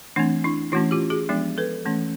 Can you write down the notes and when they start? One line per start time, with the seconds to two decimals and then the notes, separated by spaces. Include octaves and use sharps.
0.16 E3 A3 C4 D4
0.44 D4 E4
0.72 E3 A3 C#4 E4 F#4
0.91 F4 G4
1.10 F#4 G#4
1.29 F3 G#3 B3 D4
1.58 A4 B4
1.86 E3 A3 C#4